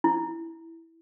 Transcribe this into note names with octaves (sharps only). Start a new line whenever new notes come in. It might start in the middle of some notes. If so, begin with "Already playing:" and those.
E4